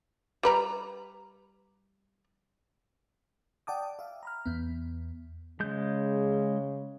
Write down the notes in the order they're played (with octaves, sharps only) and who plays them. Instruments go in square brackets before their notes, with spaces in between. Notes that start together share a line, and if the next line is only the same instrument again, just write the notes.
[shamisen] G3 B4 A#5
[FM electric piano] D5 F#5 G5 A5 D6 D#6
E5 F5
A#5 B5 F6
E2 B3
[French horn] C#3 [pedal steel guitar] G#3 G6